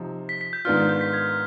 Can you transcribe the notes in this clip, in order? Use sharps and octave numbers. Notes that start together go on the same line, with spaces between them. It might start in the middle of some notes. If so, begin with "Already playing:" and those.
Already playing: C3 F3 C4 D#4
B6
B6
G6
G#2 D#3 B3 D4 F4 F6
G6
G6
B6
G#6